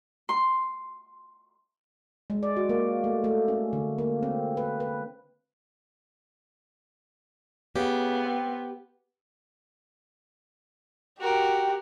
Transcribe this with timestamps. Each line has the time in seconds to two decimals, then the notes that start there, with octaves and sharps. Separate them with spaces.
0.29 C6
2.30 G#3
2.43 D5
2.57 F#4
2.69 A#3
3.04 A3
3.24 A3
3.48 C#4
3.73 D3
3.98 A#3
4.23 C4
4.57 B4
4.80 B4
7.76 C#3 B3 G4
8.25 C4
11.21 F#4 G4 A#4